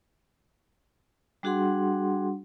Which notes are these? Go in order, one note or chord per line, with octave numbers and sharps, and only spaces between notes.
G3 D4 F#4 G#4 F#5 C6